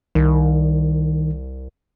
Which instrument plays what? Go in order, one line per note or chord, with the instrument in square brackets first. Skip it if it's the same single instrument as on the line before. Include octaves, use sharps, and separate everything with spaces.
[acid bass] C2 [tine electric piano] D#3